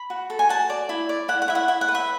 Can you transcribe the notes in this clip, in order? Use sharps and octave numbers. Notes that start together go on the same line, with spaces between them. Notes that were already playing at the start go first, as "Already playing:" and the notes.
Already playing: B5
F#4
A4
G#5
F#4 A5
D5
E4
D5
E4 F#5
F#5
E4 E5
F#5
E4 E5
F#5
B4
E5